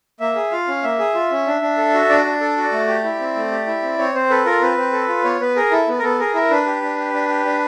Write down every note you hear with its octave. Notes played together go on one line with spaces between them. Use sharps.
A#3 E5
G#4
F4 F5
C#4
A#3 E5
G#4
F4
C#4
D4
D4
A4
F#4
D4 D5
D4
A4
F#4
A3
G4
E4
C4
A3
G4
E4
C4
C4 C#5
C4 C5
A4 B4
F4 A#4
C4 B4
C4
A4
F4
B3 C#5
B3 B4
G#4 A#4
E4 A4
B3
A#4
B3 A4
G#4 A#4
E4 A#4
D4 B4
G4
D4
G4
D4
G4
D4